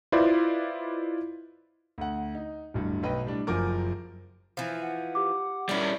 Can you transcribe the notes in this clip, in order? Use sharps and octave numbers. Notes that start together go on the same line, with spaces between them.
E4 F4 B4 C5 D5 D#5
D2 F#5
D#4
D1 G2
B1 B4 D#5 G5
A2 G3 D4
F#1 F#2 F3 A#4 D6
E3 F3
F#5
G4 D6
G3 C#4 E4 D5